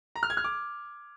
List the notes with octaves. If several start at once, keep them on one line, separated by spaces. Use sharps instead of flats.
A#5
F6
G#6
F6
D6